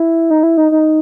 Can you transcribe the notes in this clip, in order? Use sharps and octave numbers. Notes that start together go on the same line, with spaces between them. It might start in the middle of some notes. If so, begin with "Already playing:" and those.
Already playing: E4
D#4
E4
D#4
D#4